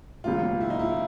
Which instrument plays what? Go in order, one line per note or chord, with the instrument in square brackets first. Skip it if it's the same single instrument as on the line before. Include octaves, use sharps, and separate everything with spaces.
[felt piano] C#2 B2 F#3 A#3 [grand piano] F4
[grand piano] E4
D#4
E4